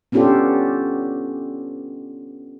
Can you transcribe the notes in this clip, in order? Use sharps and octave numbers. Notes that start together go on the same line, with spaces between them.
B3 C#4 D4 F4 G4 A4